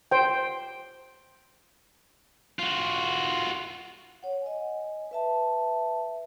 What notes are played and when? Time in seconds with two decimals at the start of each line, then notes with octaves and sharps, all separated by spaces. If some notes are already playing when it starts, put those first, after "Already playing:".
0.11 C5 G5
2.59 F4 F#4
4.23 C#5 F#5
4.42 D#5 G#5
5.11 B4 E5 A5